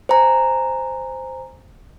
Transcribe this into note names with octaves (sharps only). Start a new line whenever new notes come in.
C5 G#5 A#5